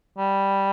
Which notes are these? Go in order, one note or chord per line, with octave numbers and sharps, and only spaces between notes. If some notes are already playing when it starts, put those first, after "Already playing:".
G3